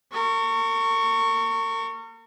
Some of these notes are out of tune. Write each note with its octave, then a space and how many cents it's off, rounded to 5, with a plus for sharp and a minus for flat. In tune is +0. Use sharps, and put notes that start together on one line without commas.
A#4 -40 C#6 +0